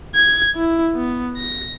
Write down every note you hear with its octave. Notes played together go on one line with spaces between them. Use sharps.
G#6
E4
B3
A#6